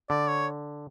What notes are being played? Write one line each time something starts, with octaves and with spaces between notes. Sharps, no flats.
D3 D5
C#5